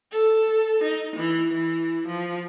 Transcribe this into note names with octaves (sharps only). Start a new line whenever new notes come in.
A4
D#4
E3
E3
F3